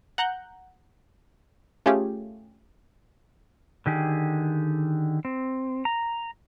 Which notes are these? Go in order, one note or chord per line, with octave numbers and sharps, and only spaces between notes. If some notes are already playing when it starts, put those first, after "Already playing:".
F#5 A#5 F#6 G6
A3 C#4 F4 G4 G#4
D3 D#3 G4 G#4
C4
A#5